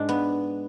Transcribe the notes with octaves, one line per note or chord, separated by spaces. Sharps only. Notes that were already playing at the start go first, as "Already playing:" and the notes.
Already playing: G#2 G#3 D4
B3